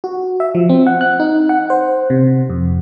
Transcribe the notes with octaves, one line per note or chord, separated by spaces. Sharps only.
F#4
E5
F3
C4
F#5
F#6
D#4
F#5
C5
C3
F2